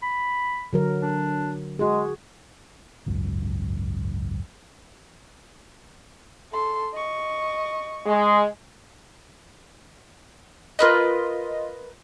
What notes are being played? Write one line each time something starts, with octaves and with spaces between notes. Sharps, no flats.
B5
D3 F#3 A#4
D4
G#3 F#4 G#4
G#1 C#2 F#2
A4 C6
D#5 C#6
G#3
F4 A#4 B4 D#5 F#6